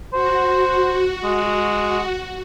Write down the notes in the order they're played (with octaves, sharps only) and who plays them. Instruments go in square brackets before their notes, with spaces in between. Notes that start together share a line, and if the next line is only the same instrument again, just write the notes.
[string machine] F#4 [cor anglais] C5
[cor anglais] G#3